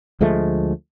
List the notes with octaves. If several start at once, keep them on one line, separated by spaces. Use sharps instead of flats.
D2 F3 G#3 A3